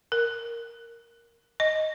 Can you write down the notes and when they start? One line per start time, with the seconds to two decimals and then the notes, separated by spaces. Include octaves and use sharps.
0.12 A#4
1.60 D#5